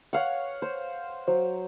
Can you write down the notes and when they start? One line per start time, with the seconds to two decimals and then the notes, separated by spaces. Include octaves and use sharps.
0.13 C#5 F5 F#5
0.62 C5
1.28 F#3 C5